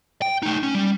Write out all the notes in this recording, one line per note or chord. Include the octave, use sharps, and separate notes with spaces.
G5
A3 D#4
C#4
G3